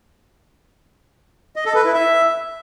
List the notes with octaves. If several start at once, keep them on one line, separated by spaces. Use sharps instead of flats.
D#5
A4
B4
E4
E5